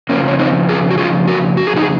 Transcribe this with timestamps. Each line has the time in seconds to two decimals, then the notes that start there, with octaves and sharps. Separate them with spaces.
0.09 F2 C#3 F3 A#3 C#4
0.28 C#4
0.39 C4 D#4
0.69 F4 G#4
0.91 F#4
0.98 F4 G#4
1.28 F#4 A#4
1.57 F#4
1.67 G#4
1.76 D#4 F#4
1.82 G#4